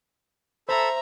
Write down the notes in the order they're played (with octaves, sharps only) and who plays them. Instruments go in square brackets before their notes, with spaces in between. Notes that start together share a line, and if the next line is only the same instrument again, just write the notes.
[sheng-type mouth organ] A4 B5 E6 [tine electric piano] C5 [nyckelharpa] E5 A#5